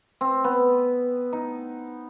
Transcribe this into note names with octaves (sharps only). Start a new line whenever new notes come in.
C4
B3
D#4